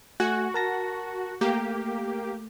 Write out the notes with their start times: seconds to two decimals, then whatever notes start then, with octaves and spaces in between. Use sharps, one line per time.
0.20 A3 F#4 G#5 F#6
0.54 A#4 A5 A#6
1.41 A3 A#3 G4